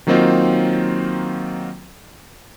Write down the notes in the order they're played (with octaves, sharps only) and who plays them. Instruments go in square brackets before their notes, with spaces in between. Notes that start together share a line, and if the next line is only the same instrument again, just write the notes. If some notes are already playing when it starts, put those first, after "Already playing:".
[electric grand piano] D#3 F#3 A#3 C4 D#4 F4